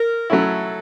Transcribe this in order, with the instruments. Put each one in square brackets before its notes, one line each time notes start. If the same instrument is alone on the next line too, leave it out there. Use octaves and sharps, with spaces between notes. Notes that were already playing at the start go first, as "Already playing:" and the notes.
Already playing: [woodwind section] A#4
[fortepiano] F#3 A3 C#4 E4 [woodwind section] A4